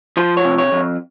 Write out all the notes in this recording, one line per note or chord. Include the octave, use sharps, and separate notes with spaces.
F3 C5
C#5
C3
C#5
F2